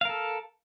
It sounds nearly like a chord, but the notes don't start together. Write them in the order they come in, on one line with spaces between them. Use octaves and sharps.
F5 A#4 A4